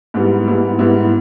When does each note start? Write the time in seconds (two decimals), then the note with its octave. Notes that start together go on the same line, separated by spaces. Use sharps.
0.14 G#2 G3 B3 E4
0.48 G#2 G3 B3 E4
0.79 G#2 G3 B3 E4